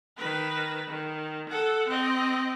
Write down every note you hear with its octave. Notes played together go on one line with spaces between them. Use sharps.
D#3 B4
D#3
A4 F#5
C4 D#5